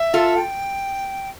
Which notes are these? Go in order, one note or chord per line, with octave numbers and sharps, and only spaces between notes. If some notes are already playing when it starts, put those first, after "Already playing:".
Already playing: E5
F4 A4
G5